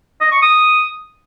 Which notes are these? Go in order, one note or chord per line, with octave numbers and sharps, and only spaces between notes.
D#5
C#6
D#6